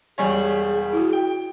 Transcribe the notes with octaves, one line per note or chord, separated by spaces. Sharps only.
E1 G3 G#4 C#5 G#5 C#6
E4 F#4
G5